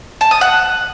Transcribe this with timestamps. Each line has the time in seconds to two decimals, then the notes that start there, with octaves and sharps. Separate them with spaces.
0.21 A5
0.31 D#6
0.41 F#5